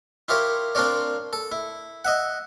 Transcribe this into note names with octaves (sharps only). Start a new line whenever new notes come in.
E4 F4 G4 A#4 C#5
C4 D4 F4 A#4 C#5 D5
A4
E4
D#5 E5 F#5